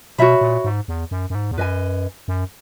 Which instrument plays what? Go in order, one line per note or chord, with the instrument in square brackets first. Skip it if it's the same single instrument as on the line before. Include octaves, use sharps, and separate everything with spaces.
[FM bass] B2 [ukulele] F#4 C#5 E5 B5
[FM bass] A#2
G#2
E2
F#2
F#2
G#2
E2
[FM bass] F#2 [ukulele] B4 D#5 G#5
[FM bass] F#2